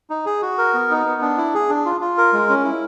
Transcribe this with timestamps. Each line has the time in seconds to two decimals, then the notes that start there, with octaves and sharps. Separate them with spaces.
0.10 D#4
0.26 G#4
0.42 F#4
0.58 A#4
0.74 B3
0.91 D#4
1.06 B3
1.22 D4
1.38 E4
1.54 G#4
1.69 D4
1.85 F4
2.01 F4
2.18 A#4
2.33 G#3
2.49 C#4
2.65 E4